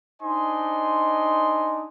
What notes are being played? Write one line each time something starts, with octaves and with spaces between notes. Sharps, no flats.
D4 D#4 C5 D#5 G#5 C6